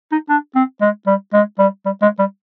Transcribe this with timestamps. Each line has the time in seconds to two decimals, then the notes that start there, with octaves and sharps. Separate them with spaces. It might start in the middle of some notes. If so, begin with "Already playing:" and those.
0.12 D#4
0.29 D4
0.55 C4
0.81 G#3
1.06 G3
1.33 G#3
1.59 G3
1.85 G3
2.02 G#3
2.19 G3